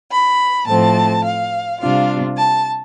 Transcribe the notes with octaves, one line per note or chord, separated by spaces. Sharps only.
B5
A2 F3 A3 C4 A5
F5
C3 G3 D4 F4 F5
A5